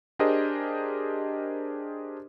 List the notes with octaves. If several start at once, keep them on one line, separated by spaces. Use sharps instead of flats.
D4 G4 G#4 A#4 C5 D#5